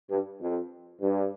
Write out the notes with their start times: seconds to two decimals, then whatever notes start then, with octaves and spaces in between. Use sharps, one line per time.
0.11 G2
0.41 F2
1.01 G2